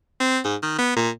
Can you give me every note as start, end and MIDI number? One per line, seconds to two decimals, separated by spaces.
0.20 0.39 60
0.44 0.56 44
0.63 0.78 51
0.78 0.94 59
0.96 1.10 46